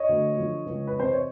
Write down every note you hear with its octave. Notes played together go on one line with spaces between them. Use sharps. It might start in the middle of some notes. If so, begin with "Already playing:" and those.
Already playing: C#5 D#5
D2
D3 F3
C#2
B4
C3 E3 C5
C#5